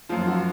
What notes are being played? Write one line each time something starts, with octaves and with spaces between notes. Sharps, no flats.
F#2 F3 F4
F#4